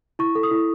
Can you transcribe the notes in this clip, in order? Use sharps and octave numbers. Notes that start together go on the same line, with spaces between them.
E4 C#6
A4
D#6
E4